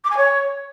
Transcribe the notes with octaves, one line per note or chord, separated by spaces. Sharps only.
D6
G#5
C#5